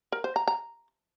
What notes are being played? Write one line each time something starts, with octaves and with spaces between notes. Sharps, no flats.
A#4
C5
A#5
A#5